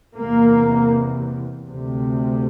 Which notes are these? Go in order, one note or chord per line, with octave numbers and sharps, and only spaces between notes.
E2 C3 A#3
D2 C3